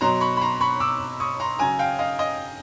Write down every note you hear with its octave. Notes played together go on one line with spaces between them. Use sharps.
B2 F#3 A#5 C6
B5 C#6
B5
A#5 C6
B5 C#6
D6 E6
C#6 D#6
A#5 C6
C#3 F#3 G#5 A#5
F5 G5
D#5 F5
D#5